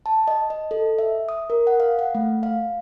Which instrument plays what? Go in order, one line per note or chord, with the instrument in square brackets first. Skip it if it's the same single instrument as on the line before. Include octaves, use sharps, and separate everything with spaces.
[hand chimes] A5
D#5
D#5
A4
E5
D#6
A#4
F#5
F5
F#5
A3
F5